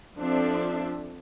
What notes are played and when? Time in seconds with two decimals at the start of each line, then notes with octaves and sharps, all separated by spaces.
0.18 F3 C4 D4 A4 E5